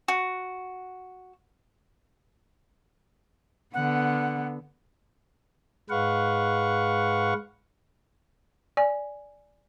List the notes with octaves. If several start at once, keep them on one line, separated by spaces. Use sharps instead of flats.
F#4
D3 B3 F#5
G#2 G#3 B4 F5 F#5 C#6
D5 G#5